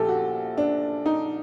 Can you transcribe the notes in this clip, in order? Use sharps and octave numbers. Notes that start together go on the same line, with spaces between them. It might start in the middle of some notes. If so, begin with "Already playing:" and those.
Already playing: A#1 A#2 G4 A4
F#4
D4
D#4